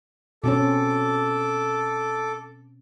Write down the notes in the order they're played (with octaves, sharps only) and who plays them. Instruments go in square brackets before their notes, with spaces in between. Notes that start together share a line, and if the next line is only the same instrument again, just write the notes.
[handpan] B2 C4 C#4 [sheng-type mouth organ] A4 D6